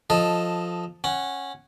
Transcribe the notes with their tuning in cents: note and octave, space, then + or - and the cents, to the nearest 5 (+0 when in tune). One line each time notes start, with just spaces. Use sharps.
F3 +5 A4 +0 D#5 +0
C#4 -10 F#5 +0